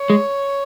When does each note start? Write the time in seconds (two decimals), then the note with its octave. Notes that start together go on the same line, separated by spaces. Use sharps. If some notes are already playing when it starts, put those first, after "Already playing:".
Already playing: C#5
0.10 G#3